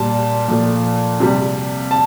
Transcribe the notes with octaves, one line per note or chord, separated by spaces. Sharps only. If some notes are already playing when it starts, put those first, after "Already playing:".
Already playing: A#2 G3 A5
A#2 F3 A3
C3 G3
A5